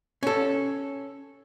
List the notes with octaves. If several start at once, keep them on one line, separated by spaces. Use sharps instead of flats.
C#4 A4